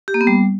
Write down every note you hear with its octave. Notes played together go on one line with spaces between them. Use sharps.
G4
A#3
B3
G3